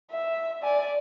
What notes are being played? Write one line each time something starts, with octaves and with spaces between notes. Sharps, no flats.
E5
D5 G#5